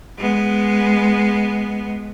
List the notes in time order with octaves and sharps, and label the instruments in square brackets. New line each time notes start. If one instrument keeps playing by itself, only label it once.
[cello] G#3 B3